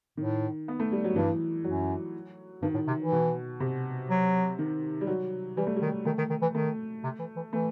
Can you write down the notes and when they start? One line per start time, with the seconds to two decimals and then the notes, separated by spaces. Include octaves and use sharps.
0.17 A2 D#3
0.68 B3
0.80 A3
0.92 G3
1.04 F#3
1.15 G2 E3
1.64 F#2 F#3
2.62 G2 D#3
2.74 A2
2.88 C3
3.00 E3
3.12 B2
3.60 C3
4.10 F#3
4.59 D#3
5.01 G3
5.07 F#3
5.57 E3 G3
5.67 A3
5.76 G3
5.82 D#3
6.05 D#3 A3
6.18 D#3
6.30 D#3
6.42 E3
6.54 D#3 A3
7.04 C3
7.19 E3
7.36 E3
7.53 E3 A3